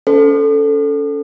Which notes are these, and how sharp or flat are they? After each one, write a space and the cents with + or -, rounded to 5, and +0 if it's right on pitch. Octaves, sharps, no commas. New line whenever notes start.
C#4 +25 A4 +0 C5 -20